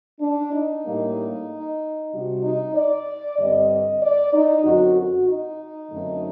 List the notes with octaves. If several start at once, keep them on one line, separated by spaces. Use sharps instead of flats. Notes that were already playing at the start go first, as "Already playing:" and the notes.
D4
D#4
A2 G3 A#3 D4
C3 G3 D4 F#4
D#4
D5
G2 D3 G3 C4 D#5
D#5
D5
D#4
F#2 D3 F#3 C4 F#4
F#4
D#4
F#2 D3 A3 C4